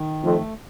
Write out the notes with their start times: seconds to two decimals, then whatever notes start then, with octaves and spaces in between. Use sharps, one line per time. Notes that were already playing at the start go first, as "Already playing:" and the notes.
Already playing: D#3
0.23 F2 A3